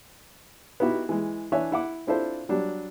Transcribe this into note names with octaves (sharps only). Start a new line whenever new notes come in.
B3 D#4 E4 F#4 G4
E3 G#3
E3 D4 C#5 E5 G#5 F#6
E4 F#5 D6
C4 D4 E4 F4 A4 C5
F#3 G3 D4